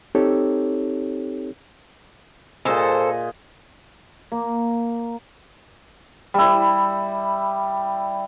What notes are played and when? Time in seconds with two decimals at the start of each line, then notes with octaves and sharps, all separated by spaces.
0.15 C4 D#4 G4 A4 C#5
2.65 A#2 G#4 A4 C5 D#5
4.32 A#3
6.34 G3 E4